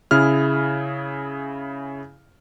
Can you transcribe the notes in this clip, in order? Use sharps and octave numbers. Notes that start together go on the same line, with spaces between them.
C#3 E4 G#4 F6